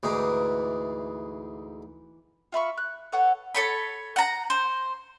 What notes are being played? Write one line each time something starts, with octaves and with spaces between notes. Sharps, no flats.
D2 G#2 E3 D#4 D6
F4 E5 B5 C#6
F#6
A4 B4 C#5 F#5
A4 C#5 B5
F#5 A#5
C5